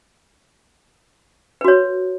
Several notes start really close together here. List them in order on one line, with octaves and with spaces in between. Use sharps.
B4 F#4 C#5